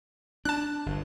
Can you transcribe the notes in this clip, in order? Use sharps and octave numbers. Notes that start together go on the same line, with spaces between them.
D4 A5 F#6
G1 G2